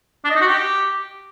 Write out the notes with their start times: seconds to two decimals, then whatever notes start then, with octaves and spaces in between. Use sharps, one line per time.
0.24 D4
0.30 D#5
0.36 D#4
0.41 F#4
0.47 G4